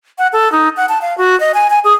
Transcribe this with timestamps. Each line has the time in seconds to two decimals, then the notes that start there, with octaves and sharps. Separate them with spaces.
0.18 F#5
0.33 A4
0.52 D#4
0.77 F#5
0.89 A5
1.02 F5
1.18 F#4
1.40 D#5
1.54 G#5
1.70 G#5
1.84 G#4